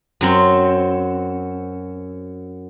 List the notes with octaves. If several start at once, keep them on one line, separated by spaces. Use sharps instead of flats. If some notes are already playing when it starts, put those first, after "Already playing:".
F#2 F#3 C4